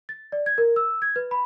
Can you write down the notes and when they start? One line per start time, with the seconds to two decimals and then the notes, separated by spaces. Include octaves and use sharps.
0.09 A6
0.32 D5
0.46 G#6
0.58 A#4
0.76 E6
1.02 G#6
1.16 B4
1.31 B5